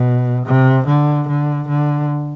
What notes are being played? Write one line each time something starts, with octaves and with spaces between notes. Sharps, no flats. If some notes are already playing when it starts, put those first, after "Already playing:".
Already playing: B2
C3
D3
D3
D3